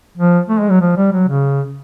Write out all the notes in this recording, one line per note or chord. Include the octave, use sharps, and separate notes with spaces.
F3
A3
G#3
F#3
F3
G3
F#3
C#3